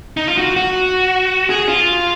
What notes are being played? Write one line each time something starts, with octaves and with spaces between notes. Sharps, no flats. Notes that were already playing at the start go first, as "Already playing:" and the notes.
D#4
F4
F#4
F#4
G#4
F4